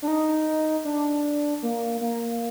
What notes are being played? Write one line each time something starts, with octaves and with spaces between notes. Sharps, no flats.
D4
D#4
D4
A#3
A#3